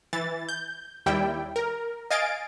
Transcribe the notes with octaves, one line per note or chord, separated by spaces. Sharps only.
E3 A6
G6
D#2 G3 E4 G5
A#4
D#5 F5 G#5 A6 D7